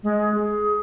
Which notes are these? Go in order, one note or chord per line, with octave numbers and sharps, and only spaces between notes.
G#3
G#4